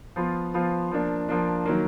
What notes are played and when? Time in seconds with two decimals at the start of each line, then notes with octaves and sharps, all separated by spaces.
0.16 F3 B3 F4
0.54 F3 B3 F4
0.91 F3 A#3 D4
1.29 F3 A#3 D4
1.66 D#3 F#3 A#3